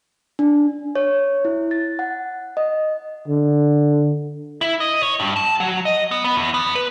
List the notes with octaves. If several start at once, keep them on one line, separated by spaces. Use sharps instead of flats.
D4
C#5
E4
A6
F#5
D#5
D3
E4
D#5
C#5
G2
A5
F#3
D#5
B3
B3
E2
B3
B4